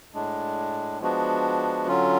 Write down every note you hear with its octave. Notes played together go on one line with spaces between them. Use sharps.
A2 G#3 D4
F3 G#3 B3 D4 F#4
D3 F#3 C#4 F4